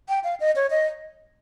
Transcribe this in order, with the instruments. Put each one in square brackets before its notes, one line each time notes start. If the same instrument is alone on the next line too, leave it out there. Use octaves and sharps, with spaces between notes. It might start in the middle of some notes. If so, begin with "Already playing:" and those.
[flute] G5
F5
D#5
C#5
D#5